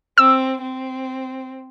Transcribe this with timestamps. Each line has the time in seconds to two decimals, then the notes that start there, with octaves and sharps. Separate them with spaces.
0.18 C4 E6
0.62 C4